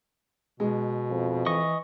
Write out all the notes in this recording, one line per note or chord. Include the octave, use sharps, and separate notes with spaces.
B2 G#3
F2
E3 D#5 C#6 D#6